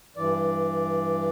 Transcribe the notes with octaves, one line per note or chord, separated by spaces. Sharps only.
G2 E3 D5